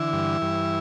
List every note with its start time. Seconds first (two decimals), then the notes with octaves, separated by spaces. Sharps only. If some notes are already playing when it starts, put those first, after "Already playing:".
Already playing: D3 E3 E4
0.13 G2
0.42 G2